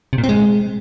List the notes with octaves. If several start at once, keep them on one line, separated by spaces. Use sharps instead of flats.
C3
A#2
C4
G#3